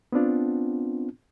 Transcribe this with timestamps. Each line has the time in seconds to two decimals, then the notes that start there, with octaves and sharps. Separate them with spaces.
0.12 B3 C4 D4 F4